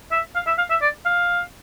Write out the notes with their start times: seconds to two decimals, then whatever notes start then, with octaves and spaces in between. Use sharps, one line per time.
0.11 E5
0.35 F5
0.47 E5
0.58 F5
0.70 E5
0.81 D5
1.05 F5